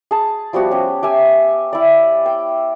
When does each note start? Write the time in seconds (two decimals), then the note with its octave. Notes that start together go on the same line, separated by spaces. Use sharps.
0.11 G#4 A5
0.53 F3 G3 B3 F#4
0.71 C#4 G4
1.03 G4 E5 G#5
1.73 E4 D5
2.26 G5